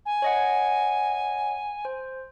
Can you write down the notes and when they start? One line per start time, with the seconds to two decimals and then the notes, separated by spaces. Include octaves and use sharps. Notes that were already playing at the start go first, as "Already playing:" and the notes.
0.06 G#5
0.22 C#5 D#5 F#5
1.85 C5